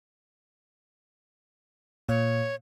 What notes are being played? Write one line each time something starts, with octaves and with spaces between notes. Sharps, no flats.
A#2 C#5